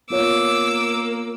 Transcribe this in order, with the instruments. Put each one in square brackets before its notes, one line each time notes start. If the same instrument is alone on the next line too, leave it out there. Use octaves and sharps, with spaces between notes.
[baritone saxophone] A#3 [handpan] B3 F4 C#5 [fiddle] D6 E6